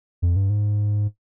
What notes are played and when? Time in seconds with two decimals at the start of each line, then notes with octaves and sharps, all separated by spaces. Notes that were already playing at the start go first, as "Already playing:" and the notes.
0.22 F2
0.36 G2
0.50 G#2